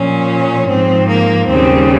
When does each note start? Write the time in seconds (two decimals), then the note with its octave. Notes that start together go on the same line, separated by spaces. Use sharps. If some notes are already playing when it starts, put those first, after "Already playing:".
Already playing: A#2 F3 C#4
0.69 G#2 F3 C4
1.08 A#3
1.47 D#2 C#3 G3 C4